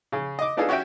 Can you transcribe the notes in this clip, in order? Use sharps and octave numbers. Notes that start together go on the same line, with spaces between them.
C#3 G#4
D#5 D6
B3 D4 D#4 F4 G#4 A4
C#4 F#4 C#5 E5 G5